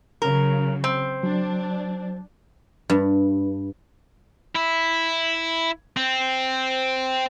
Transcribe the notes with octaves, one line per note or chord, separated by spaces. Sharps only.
C#3 F#3 A#4
C4
F#3 D4
G2
E4
C4